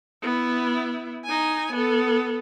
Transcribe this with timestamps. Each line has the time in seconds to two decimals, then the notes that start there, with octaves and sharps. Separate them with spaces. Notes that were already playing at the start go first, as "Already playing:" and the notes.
0.23 B3 E4
1.25 D#4 G#5
1.73 B3 A4